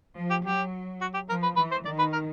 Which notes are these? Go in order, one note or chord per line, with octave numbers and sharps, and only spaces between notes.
F3
G4
F#3 G4
F#4
G4
F3 A#4
B4
E3 B4
C5
D#3 D5
B4
A#4